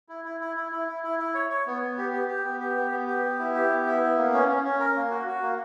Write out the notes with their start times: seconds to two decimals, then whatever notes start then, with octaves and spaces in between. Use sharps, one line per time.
0.09 E4
0.25 E4
0.40 E4
0.57 E4
0.72 E4
0.88 E4
1.04 E4
1.19 E4
1.35 C#5
1.50 C#5
1.67 B3
1.82 B3
1.98 G4
2.13 G4
2.28 G4
2.45 B3
2.60 G4
2.77 B3
2.91 B3
3.07 G4
3.23 B3
3.39 E4
3.54 G4
3.70 B3
3.86 E4
4.02 B3
4.17 A#3
4.33 C#4
4.48 C#4
4.64 C#4
4.80 A#4
4.96 A#3
5.11 F#4
5.27 F#4
5.43 A#3